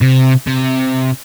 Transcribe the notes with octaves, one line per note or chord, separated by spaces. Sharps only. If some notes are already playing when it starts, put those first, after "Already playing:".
C3
C3